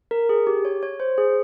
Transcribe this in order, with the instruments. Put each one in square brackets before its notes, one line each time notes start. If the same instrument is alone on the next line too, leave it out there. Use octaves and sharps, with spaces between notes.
[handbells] A#4
G#4
G4
C#5
C#5
C5
G#4